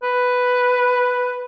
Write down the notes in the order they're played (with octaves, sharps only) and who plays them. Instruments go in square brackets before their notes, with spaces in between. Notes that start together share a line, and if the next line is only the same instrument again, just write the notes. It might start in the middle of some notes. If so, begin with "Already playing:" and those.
[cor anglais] B4